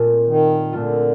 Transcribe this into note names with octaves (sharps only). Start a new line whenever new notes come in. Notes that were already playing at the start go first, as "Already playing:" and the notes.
Already playing: A#2 A3 C4 F4
D#3
A#2 D3 A3 C4 F4